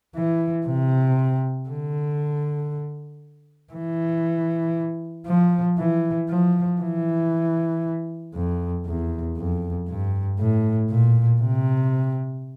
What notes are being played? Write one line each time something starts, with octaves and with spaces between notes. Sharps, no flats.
E3
C3
D3
E3
F3
E3
F3
E3
F2
E2
F2
G2
A2
A#2
C3